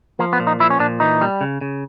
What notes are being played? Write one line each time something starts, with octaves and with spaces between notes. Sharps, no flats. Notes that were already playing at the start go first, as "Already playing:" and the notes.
F3 A#3
B3
A#2
D#4
F3 E4
C#4
A#2 D4
E3 D#4
G3
C#3
C#3